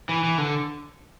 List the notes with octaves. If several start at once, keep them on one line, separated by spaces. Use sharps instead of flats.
E3
E3
D3